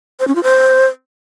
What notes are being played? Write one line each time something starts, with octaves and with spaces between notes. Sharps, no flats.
C5
C#4
F4
C5